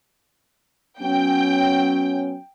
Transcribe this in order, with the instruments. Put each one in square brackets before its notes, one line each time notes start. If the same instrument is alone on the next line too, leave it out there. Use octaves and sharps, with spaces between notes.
[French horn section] F#3 B3 C#4 [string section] G5